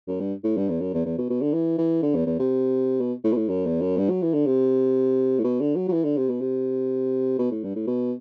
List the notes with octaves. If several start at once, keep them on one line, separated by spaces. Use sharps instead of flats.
F#2
G2
A2
G2
E2
F#2
E2
E2
B2
B2
D3
E3
E3
D3
E2
E2
C3
B2
A2
B2
A2
F#2
E2
F#2
G2
F#3
E3
D3
C3
A2
B2
D3
F#3
F#3
E3
D3
C3
B2
C3
B2
A2
G2
A2
B2